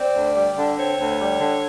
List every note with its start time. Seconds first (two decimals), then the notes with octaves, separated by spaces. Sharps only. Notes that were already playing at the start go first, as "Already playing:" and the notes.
Already playing: C4 D5
0.15 D2
0.35 G3
0.57 D3
0.77 C4 C#5
0.99 D2
1.20 G3
1.40 D3